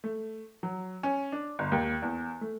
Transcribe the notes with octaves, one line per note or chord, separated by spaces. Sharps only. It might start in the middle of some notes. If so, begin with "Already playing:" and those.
A3
F#3
C#4
D4
G1
D#2
E2
A3